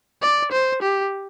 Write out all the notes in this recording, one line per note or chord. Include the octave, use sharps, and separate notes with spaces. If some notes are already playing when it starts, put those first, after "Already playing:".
D5
C5
G4